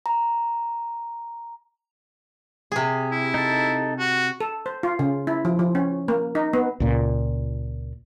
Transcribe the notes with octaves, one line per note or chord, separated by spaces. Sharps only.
A#5
C3 G#4
E4
D#4 A4
F#4
A4
C5
F4
C#3
E4
F3
F3
C#4
A#3
D#4
B3
C#2 A#2